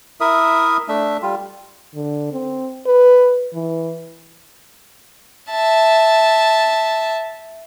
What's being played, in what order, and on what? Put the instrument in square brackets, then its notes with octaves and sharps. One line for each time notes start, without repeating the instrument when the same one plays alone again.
[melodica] E4 A#4 E5 D#6
A3 D4 E5
G3 F4
[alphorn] D3
C4
B4
E3
[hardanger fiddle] E5 A5